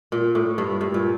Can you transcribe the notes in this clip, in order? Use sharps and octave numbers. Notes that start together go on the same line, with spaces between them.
A#2
A2
G2
G2
A#2